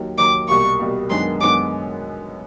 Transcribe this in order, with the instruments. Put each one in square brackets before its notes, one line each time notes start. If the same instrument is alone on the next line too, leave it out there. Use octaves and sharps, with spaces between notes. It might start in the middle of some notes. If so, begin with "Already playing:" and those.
Already playing: [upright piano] D#2 D#3 F#3
[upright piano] D#2 D#3 F#3 [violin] D6
[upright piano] C2 B2 G3 A#3 [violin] C#6
[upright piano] C2 B2 G3 A#3
[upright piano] F#2 D#3 G#3 B3 D4 [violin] C6
[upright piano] F#2 D#3 G#3 B3 D4 [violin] D6